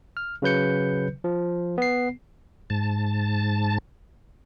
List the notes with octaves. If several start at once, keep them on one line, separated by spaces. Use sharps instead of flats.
F6
C#3 F#3 B4 G6 C#7
F3
B3 C7
G#2 A5